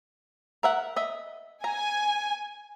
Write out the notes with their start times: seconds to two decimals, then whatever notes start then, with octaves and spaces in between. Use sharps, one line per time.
0.63 A#4 E5 F#5
0.96 D#5 E5
1.64 G#5 A#5